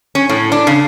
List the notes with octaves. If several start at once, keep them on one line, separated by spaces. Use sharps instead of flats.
C#4
A2
D4
C#3